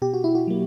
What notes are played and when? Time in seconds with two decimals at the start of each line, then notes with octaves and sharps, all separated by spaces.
0.02 B2 G4
0.14 F#4
0.24 E4
0.35 F#4
0.47 F#3 A#3